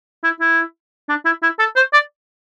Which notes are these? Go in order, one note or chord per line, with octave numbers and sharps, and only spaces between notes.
E4
E4
D4
E4
E4
A4
C5
D5